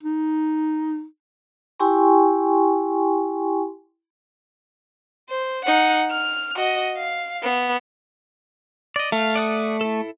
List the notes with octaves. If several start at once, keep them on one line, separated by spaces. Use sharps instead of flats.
D#4
E4 G4 G5 G#5 C6 C#6
C5
D#4 F#5
F6
F#4 D#5
F5
B3
D5 D#5
A3 F5
D5 F#5 D#6
E4 A4